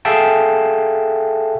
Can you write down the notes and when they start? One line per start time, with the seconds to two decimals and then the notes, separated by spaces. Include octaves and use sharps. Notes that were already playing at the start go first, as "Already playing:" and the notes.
0.05 G#4 A4 E5 F5 G5 A5